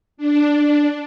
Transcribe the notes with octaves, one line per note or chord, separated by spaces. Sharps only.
D4